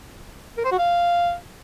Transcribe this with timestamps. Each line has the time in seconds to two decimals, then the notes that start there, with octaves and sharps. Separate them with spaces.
0.58 A#4
0.65 C5
0.71 F#4
0.78 F5